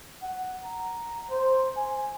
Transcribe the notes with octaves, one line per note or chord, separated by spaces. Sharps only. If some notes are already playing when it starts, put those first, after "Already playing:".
F#5
A#5
C5
G#5